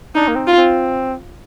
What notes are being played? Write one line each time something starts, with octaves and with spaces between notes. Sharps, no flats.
D4 D#4
A#3
C4
F4
C4